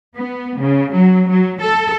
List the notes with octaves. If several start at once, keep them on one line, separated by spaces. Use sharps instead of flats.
B3
C#3
F#3
F#3
A4